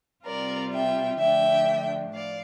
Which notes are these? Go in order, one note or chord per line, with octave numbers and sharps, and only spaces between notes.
C3 G3 C4 F4 A#4 D5
E5 G5
D3 F3 A3 D4 E5 G5
A2 F3 D5 F5